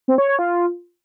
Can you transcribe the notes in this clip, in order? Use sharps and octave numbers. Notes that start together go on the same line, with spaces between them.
C4
C#5
C#5
F4